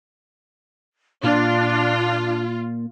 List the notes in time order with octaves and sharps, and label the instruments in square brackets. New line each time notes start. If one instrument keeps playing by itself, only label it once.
[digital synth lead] A#2 [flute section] D4 [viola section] F4